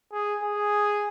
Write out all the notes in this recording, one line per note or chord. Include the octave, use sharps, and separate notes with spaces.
G#4
G#4